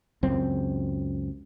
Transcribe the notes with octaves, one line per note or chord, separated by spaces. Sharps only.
C#2 F#2 C4